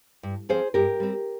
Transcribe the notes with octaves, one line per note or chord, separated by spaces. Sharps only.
G2
F3 C4 G#4 C5
G2 G4 A#4
G3 C4